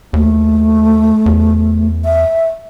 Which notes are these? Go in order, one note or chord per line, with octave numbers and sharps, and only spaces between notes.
D#2 A3
E2
E5